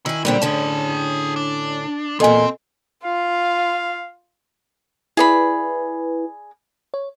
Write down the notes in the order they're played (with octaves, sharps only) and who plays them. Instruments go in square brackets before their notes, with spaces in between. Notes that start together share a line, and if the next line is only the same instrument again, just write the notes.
[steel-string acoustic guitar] D#3 G#5 [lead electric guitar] E4
[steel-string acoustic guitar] A#2 D3 C4 [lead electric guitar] G3
[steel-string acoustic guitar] A2 D3 C#4 [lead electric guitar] G#4 A5
[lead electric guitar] D4
[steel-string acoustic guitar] E2 A#2 [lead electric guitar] C4 [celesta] A4 D#5 G#5
[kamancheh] F4 [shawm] F5
[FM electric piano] E4 B4 [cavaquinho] G#4 D5 B5
[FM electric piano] C#5